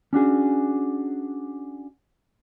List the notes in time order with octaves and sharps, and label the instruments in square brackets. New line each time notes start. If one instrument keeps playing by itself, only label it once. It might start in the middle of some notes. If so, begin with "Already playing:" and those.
[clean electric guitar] C#4 D4 F#4 G#4